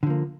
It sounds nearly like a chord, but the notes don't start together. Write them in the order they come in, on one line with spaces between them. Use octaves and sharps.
D3 F3 A#3